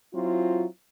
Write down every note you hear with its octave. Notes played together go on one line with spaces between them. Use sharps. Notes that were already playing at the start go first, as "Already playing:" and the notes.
F#3 C4 E4 F4